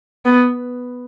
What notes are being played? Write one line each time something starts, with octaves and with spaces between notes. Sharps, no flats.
B3